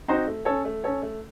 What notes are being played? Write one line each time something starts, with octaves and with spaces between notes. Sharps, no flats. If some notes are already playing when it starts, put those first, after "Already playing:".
C4 D#4 F#4 C5
A3
C#4 A4 C#5
A3
C#4 A4 C#5
A3